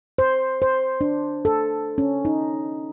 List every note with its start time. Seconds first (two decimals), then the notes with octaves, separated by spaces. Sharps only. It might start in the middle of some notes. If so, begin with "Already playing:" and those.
0.18 C5
0.62 C5
1.01 D4
1.45 A4
1.98 C#4
2.25 D#4